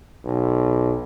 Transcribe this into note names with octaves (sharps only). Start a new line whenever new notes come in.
B1